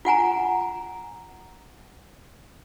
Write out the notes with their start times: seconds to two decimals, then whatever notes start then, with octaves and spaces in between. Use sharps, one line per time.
0.05 F4 F#5 G#5 A#5